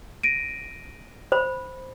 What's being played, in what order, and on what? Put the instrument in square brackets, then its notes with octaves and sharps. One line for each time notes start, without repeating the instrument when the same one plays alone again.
[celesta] A#6 D7 D#7
[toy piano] C5 B5